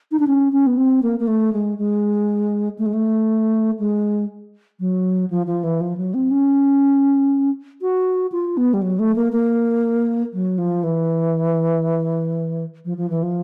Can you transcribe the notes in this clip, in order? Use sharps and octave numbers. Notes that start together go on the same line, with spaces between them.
D#4
D4
C#4
C#4
B3
C4
A#3
A#3
A3
G#3
G#3
A3
G#3
A3
G#3
F#3
F3
F3
E3
F3
F#3
C4
C#4
F#4
F4
B3
G3
F#3
A3
A#3
A#3
F#3
F3
E3
F3
F3
E3
F3